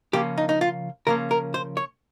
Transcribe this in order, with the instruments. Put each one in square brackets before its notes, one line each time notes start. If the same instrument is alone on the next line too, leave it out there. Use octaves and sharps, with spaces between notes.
[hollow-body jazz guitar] C#3 F3 A#3 C#4 G4
D#4
D#4
F4
C#3 F3 A#3 C#4 A#4
A#4
C5
C#5